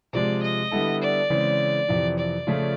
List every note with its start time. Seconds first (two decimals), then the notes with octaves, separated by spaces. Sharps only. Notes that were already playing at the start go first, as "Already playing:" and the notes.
0.13 C3 F3 G#3 D5
0.42 D#5
0.71 D3 G3 B3 E4 A4
1.01 D5
1.30 C#3 E3 G#3 C4
1.88 F2 C3 E3
2.18 D5
2.47 C#3 F3 A3 C#4 F4